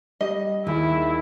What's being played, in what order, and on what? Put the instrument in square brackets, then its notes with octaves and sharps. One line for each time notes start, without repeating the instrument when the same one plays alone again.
[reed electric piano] G3 [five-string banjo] D#5
[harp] D#2 [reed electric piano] D#3 G#4 [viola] E4